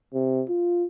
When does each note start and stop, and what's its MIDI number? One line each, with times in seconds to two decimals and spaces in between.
0.14 0.43 48
0.49 0.85 65